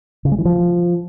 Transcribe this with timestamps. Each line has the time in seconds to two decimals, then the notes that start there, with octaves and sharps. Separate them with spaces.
0.25 C#3
0.32 G#3
0.38 E3
0.45 F3